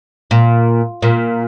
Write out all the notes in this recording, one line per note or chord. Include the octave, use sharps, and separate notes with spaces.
A#2
A#2